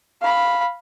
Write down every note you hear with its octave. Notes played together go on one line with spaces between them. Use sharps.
F5 B5